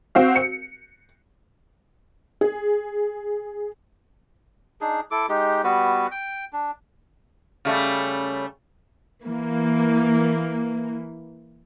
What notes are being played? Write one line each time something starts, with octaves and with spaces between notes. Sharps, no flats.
C4 F#4 F5
C#7
G#4
D4 D#4 G#4
E4 A4 D6
G#3 D#4 G4
G3 B3 F#4 B4
G5
D4
C#3 G3 A3
E3 A#3